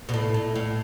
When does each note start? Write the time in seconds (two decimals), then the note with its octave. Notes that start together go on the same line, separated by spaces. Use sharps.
0.09 B2
0.14 A2
0.34 A2
0.56 A2